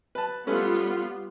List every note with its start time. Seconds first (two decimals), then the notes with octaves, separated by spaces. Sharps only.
0.15 B4 A5
0.47 G3 A3 B3 C#4 F4 B4